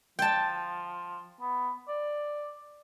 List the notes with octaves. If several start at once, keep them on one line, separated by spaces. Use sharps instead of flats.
F3 G5 A5
B3
D5